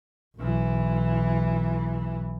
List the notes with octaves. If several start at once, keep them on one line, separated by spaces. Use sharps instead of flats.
B1 E3